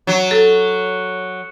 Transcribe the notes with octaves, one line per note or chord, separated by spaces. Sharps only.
F#3
A4